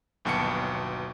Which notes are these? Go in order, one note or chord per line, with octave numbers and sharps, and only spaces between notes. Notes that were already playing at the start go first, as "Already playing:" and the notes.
G1 D#2 B2 F#3 A5 C#7